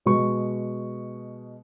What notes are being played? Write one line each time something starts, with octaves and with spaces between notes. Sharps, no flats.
B2 G#3 C#6